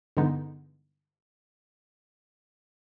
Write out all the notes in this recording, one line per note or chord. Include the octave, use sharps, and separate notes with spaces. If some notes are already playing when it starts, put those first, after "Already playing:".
G2 D3 E3 G#3 B3 D#4